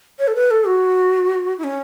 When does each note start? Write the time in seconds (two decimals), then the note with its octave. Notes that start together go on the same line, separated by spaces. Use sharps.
0.19 C#5
0.28 A4
0.35 B4
0.51 A4
0.67 F#4
1.58 E4
1.64 C#4